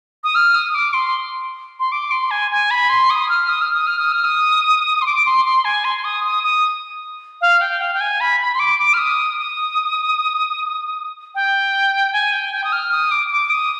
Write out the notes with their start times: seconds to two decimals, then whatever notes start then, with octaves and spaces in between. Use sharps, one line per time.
0.24 D#6
0.35 F6
0.55 D#6
0.74 D6
0.94 C6
1.80 C6
1.92 D6
2.11 C6
2.31 G#5
2.51 G#5
2.71 B5
2.90 C6
3.10 D#6
3.29 F6
3.49 D#6
3.61 F6
3.74 D#6
3.87 F6
3.99 D#6
4.12 F6
4.24 D#6
5.02 C6
5.06 D6
5.26 C6
5.45 C6
5.65 G#5
5.85 C6
6.04 D#6
6.24 D#6
6.44 D#6
7.41 F5
7.61 G5
7.81 F5
7.94 G5
8.01 G#5
8.20 B5
8.40 B5
8.54 C6
8.59 D6
8.79 D6
8.94 F6
8.99 D#6
9.38 D#6
11.35 G5
12.13 G#5
12.33 G5
12.53 G5
12.64 D#6
12.72 F6
12.92 D#6
13.11 D6
13.31 D6
13.50 D#6